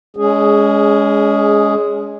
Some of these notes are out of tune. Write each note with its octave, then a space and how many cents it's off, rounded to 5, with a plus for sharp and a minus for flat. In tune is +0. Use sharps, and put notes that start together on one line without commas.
G#3 +10 C#4 +35 G#4 +0